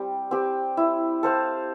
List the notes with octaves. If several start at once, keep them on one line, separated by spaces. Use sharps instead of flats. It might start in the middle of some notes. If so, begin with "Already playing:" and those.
Already playing: G3 C4 G4
C4 G4
E4
A4 C5 F5